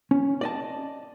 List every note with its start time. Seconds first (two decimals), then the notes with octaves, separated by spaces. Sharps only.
0.11 C#4
0.41 D5 D#5 A5